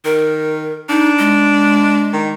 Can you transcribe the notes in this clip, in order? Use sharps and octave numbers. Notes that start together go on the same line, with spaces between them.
D#3 A#4
D4 D#4
G#3
D#3